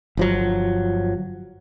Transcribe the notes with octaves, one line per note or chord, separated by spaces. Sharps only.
G1 F3 F#3